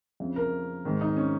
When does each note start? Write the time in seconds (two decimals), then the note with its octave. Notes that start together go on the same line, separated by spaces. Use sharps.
0.20 F2 C#3
0.36 A#4
0.85 G#2 D#3
1.01 D#4
1.17 C#4